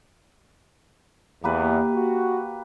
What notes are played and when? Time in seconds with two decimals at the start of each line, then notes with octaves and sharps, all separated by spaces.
1.44 E2 A#3 G4 B4
1.94 F#4